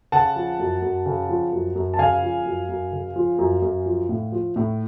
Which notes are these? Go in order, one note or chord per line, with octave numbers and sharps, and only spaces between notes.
C#3 F#5 A5
F3
F#2
F#2
C#3
F3
F#2
F#2
A5
C#3 F5 G#5
F3
F#2
F#2
C#3
F3
F#2
F#2
F3
A2
F3
A2